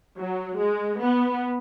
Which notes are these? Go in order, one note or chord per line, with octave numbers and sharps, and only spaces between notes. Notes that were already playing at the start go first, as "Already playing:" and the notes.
F#3
G#3
B3